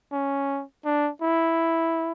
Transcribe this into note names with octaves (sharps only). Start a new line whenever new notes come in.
C#4
D4
E4